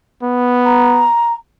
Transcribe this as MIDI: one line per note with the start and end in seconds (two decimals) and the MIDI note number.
0.23 1.09 59
0.65 1.33 82